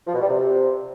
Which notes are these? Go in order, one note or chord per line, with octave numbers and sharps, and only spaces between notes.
F3
B2
G3
C3